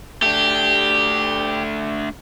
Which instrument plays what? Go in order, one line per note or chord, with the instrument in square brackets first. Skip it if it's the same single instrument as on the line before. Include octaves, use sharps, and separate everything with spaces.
[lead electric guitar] A3 D4 [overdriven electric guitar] G4